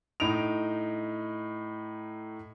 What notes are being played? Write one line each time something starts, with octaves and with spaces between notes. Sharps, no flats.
A2 D#4 D7 F7